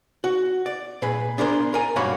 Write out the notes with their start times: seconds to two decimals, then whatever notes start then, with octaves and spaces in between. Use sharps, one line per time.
0.24 F#4
0.66 D5
1.02 A#2 G#4 B4
1.38 B3 D4 G#4 A#4 C5
1.74 A#4 G#5
1.96 B1 G2 A#3 F#4 C#5 B5